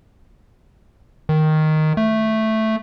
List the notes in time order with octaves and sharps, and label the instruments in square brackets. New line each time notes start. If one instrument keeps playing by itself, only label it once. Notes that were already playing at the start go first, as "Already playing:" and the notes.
[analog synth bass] D#3
A3